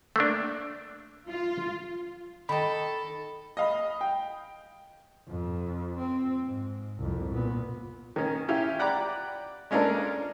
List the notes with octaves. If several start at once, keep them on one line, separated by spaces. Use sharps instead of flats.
A3 A#3 D4
F4
D#3 A4 D#5 B5
D#5 F5 B5
G5
F2
C4
G#2
C2 F2
A#2 B3
D#3 C#4
C#4 E4 F4 G4
D5 F#5 G5 A#5 B5 D6
G#3 C#4 D4 F4 A4 A#4